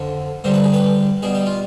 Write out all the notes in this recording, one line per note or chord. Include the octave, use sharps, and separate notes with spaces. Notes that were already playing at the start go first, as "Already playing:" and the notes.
Already playing: F2 D3 F3
G2 D3 G3 C5
B4
G#4
G4 B4
B2 G3 G#4
G4
F4